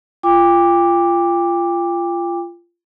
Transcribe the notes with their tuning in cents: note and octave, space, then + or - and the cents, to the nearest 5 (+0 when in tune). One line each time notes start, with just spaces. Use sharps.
F4 -20 G5 +35 D6 +0